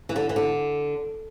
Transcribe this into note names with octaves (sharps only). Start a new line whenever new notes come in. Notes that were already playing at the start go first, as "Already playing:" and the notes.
E3
D3
E3
D3